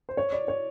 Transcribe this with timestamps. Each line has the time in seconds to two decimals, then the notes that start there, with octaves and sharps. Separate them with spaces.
0.09 C5
0.17 C#5
0.32 D5
0.48 C#5